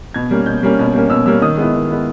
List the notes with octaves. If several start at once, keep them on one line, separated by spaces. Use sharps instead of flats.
B2 G#6
G3 A#3 C#4
B2 G6
G3 A#3 C#4
B2
G3 A#3 C#4
B2 E6
G3 A#3 C#4 E6
D#3 D#6
G#3 B3 E4
D#3
G#3 B3 E4